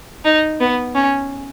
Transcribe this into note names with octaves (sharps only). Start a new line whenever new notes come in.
D#4
B3
C#4